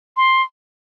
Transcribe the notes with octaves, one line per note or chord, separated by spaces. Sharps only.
C6